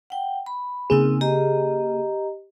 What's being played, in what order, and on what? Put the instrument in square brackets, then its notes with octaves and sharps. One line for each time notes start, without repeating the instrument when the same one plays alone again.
[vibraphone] F#5 G5
B5
[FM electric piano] C#3 A#3 G#4 [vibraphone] C4 D#4 E6
[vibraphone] G4 D#5 A#5